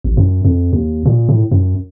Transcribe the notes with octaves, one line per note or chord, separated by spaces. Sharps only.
A1
F#2
F2
D#2
A#2
A2
F#2